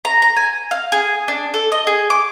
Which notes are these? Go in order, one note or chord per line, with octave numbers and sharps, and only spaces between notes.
A#5
A#5
G#5
F5
G#4
D4
A4
D#5
G#4
D6